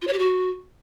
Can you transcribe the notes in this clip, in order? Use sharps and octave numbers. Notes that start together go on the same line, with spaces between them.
F4
C#5
G4
F#4